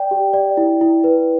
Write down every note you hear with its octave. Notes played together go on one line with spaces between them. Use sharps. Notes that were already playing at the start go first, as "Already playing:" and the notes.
Already playing: D5 G5
G4
D5
E4
E4
B4